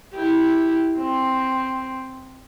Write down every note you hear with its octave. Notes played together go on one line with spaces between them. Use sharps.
E4 G4
C4